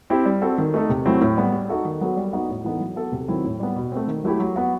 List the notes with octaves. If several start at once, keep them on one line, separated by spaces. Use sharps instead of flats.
C4 E4 G4
G3
C4 F#4 A4
D#3
A3 D#4 A4
C3
F#3 A3 C4 E4
A2
G3 B3
G3
D#4 F#4 A4
D#3
F#3 B3 F#4 A4
G3
B3 D#4 F#4
A2
E3 B3 D#4 A4
F#3
B3 F#4 A4
C3
D#3 F#3 C4 E4
A2
G3 B3
B2
A3 C4
D#3
F#3 A3 E4 G4
F#3
B3 F#4